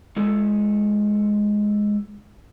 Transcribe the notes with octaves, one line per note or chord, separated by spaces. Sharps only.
G#3 F4 A4